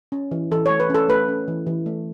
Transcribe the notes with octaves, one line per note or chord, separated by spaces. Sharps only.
C#4
E3
E3 A4
A3 C#5
B4
C#4 A4
A3 B4
C#4
E3
E3
A3